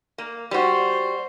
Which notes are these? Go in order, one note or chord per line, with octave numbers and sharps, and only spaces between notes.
A#3
G3 F#4 C5